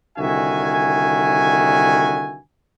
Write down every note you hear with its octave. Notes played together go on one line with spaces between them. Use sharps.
C2 D3 D#3 F#4 E5 G#5